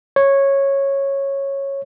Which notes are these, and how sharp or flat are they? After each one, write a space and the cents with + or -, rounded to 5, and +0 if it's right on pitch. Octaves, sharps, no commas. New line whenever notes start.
C#5 -10